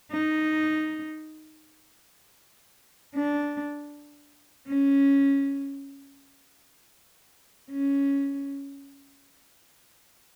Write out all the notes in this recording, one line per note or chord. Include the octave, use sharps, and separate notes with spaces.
D#4
D4
C#4
C#4